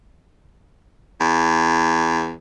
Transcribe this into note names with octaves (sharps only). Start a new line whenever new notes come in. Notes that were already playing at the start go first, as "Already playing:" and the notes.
E2